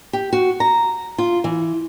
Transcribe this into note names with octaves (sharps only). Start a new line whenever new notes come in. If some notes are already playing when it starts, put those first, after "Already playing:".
G4
F#4
A#5
F4
E3